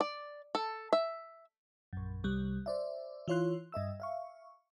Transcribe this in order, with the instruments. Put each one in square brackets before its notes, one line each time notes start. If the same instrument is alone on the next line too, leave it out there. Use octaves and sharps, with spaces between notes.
[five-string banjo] D5
A4
E5
[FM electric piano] A#1 F#2
C2 G3 F#6
C5 D5 E5
E3 F4 C#5 C6 F#6
G2 D#5 E5 E6
E5 F5 C#6